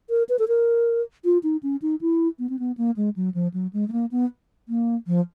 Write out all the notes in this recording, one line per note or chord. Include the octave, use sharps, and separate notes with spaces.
A#4
B4
A4
A#4
F4
D#4
C#4
D#4
E4
B3
C4
B3
A#3
G#3
F#3
F3
F#3
G#3
A3
A#3
B3
A#3
F3